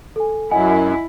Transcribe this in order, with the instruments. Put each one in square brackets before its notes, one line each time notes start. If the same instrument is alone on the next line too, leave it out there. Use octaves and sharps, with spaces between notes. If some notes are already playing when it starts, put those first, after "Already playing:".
[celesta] A4 G#5
[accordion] F#2 [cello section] E4 [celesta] D#5 F#5 G#5